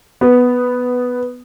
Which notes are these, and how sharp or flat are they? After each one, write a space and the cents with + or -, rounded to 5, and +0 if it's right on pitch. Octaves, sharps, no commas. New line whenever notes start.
B3 +0